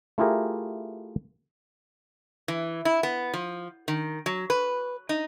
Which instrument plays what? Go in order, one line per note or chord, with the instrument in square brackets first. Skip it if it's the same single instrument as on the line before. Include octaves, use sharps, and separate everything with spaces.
[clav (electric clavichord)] A3 E4 F4 G4 G#4 A#4
[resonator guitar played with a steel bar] E3
E4
B3
F3
D#3
F#3
B4
D#4